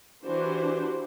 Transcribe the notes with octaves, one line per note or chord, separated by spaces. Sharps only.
E3 D4 F#4 G4 C5